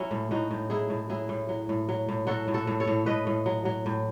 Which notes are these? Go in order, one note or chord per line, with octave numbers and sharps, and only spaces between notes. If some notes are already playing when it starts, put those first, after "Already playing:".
Already playing: F#3 C#4 E4
A2
A2 D#4 F#4
A2
F#3 E4 G#4
A2
F#3 E4 G#4
A2
F#3
A2
F#3
A2
F#3 F#4 A4
A2
F#4 A4
A2
A4 C#5
A2
A2 B4 D#5
A2
F#3
F#3
A2